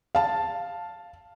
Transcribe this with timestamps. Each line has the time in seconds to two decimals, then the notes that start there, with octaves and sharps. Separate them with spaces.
0.15 F5 A5